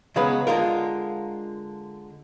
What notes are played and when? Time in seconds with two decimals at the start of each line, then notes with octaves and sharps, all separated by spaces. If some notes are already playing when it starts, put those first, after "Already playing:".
0.16 C#3 F#3 G#3 B3 B4
0.47 D3 G#3 F4 A#4